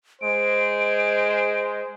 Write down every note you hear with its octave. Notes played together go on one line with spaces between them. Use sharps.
G#3 C5 D7